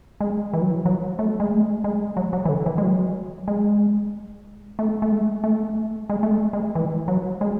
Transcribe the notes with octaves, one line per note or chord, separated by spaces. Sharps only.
G#3
E3
F#3
E3
F#3
A3
G#3
A3
G#3
F#3
F#3
E3
D3
E3
G#3
F#3
G#3
A3
A3
G#3
A3
G#3
A3
G#3
G#3
E3
F#3
G#3